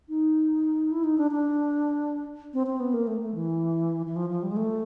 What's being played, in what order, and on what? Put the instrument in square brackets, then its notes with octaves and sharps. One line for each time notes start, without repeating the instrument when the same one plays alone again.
[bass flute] D#4
E4
D#4
D4
D4
C4
C4
B3
A#3
A3
A3
E3
E3
F3
F3
G3
G#3
A3